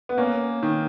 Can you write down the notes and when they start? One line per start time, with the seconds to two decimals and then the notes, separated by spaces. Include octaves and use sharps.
0.09 B3
0.18 A#3 C#4
0.63 D#3